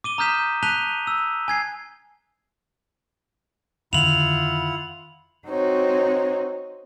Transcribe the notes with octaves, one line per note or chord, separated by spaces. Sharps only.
D6 D#7 G7
A#5 D#6 F6 G6 B6 E7
A5 F#6 B6 D#7 F7 G7
E6
G#5 G#6 C7
F2 D3 D#3 E4 F4 F#5 F7 F#7
C4 D#4 F#4 C5 C#5